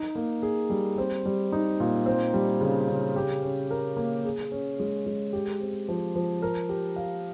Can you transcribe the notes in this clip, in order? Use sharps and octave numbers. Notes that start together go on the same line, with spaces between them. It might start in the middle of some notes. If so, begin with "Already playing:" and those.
Already playing: D#4
A#3
G#4
G3
C4
G3
D#4
A#2
C4
G3
C#3
C#3
G4
C#4
A#4
A#3
G#4
C#4
G#3
G#3
G4
C4
F3
F3
A#4
G4
F5